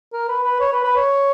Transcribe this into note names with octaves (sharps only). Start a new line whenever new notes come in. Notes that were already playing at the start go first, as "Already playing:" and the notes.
A#4
B4
B4
C#5
B4
B4
C#5